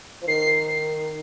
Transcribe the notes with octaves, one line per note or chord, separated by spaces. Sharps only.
F3
D#3 C7